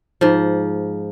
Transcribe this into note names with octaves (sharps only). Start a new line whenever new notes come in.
G#2 F3